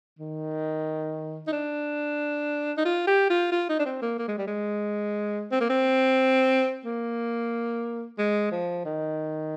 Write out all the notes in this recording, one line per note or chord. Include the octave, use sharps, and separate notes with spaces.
D#3
D#4
D4
D#4
F4
G4
F4
F4
D#4
D4
C4
A#3
A#3
G#3
G3
G#3
C4
A#3
C4
A#3
G#3
F3
D#3